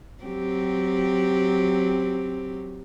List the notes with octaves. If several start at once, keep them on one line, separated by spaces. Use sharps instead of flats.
F#3 C4 G4